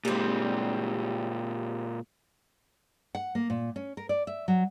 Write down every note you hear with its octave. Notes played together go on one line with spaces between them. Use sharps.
A#2 G3 G#3 C4
F#5
A#3
A#2
C#4
A#4
D5
E5
F#3